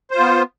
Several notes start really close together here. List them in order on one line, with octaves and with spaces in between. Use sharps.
C5 F4 B3